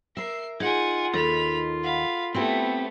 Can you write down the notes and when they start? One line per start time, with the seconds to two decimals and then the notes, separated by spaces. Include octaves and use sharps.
0.17 A#4 E5 C7
0.60 D#4 F4 G#4 F#5 G#5
1.14 D#2 D#4 A4 B5 F7
1.84 F5 F#5 B5
2.34 A3 B3 C4 E4 G4